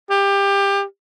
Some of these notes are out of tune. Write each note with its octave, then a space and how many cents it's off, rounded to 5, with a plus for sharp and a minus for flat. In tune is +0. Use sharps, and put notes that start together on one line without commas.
G4 +20